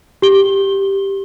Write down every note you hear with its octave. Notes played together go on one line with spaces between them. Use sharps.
G4 G7